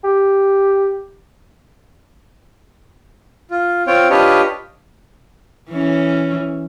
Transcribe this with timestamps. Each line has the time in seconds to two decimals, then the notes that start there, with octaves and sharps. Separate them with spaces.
0.04 G4
3.51 F4
3.87 C4 F4 C#5 G5
4.10 D4 F4 G4 B4 C#5 D#5
5.70 E3 C#4